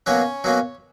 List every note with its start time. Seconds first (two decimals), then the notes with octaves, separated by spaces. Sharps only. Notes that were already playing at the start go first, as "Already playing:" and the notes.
0.06 B2 F#3 A#3 C#4 C#5
0.44 B2 F#3 A#3 C#4